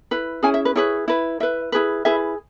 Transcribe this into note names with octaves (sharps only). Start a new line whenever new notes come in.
E4 B4
C#4 E4 G#4 G#5
E5
B4
E4 G#4 B4 C#5
E4 B4
E4 B4 E5
E4 G#4 B4
E4 G#4 B4 E5